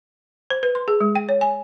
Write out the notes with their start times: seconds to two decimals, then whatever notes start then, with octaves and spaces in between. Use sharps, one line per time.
0.50 C5
0.63 B4
0.75 C6
0.88 G#4
1.00 G#3
1.15 G5
1.29 C#5
1.41 G#5